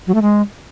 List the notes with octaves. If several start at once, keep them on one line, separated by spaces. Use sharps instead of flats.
F#3
A3
G#3